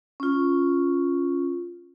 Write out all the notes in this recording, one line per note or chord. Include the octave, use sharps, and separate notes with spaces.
C#4 F4